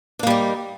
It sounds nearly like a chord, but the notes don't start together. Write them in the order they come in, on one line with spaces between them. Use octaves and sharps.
D4 A#3 G3 D#4